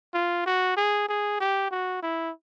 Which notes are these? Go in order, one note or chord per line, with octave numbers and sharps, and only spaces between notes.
F4
F#4
G#4
G#4
G4
F#4
E4